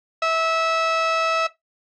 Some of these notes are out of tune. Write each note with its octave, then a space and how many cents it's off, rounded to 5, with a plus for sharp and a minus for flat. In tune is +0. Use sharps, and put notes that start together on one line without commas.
E5 -20